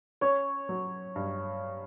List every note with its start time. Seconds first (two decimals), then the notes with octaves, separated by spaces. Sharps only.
0.21 C#4 C#5
0.69 F#3
1.16 G2